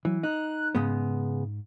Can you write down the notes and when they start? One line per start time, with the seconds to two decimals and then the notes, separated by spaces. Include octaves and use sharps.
0.05 E3 F#3
0.23 D#4 F#6
0.75 G#2 C#3 G#3 B3